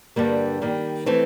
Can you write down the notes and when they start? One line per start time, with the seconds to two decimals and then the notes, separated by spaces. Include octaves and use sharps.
0.16 G2 D3 G3 A#3
0.62 D#3 G3 A#3
1.06 E3 A3 C4 E4